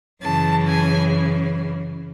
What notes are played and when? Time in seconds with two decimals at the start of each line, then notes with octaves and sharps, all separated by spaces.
0.22 F#2 C#3 E3 A5
0.68 G#5